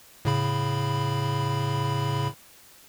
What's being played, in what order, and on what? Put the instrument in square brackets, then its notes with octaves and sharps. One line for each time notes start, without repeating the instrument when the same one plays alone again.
[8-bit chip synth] A2 C#3 B5